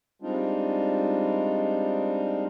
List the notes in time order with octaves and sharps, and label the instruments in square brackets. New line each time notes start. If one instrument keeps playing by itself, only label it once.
[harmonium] G3 G#3 C4 D4 D#4 F4